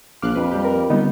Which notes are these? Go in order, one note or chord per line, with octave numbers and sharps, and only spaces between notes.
A#1 F5 D6 F6 F#6
F2 B4
G3 G4
A#4 B4
D3 G3 B3 D#4